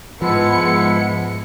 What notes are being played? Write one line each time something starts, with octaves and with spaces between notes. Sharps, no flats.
G#2 F3 G#3 B3 E4 C#7